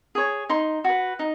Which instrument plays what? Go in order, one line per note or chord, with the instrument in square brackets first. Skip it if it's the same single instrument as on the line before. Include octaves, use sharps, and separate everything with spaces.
[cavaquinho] G#4 C#5
D#4 C6
F#4 B4
D#4